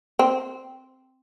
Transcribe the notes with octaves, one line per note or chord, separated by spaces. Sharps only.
C4